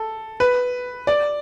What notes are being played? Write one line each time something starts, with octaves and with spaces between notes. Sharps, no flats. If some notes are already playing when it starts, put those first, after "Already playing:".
Already playing: A4
B4
D5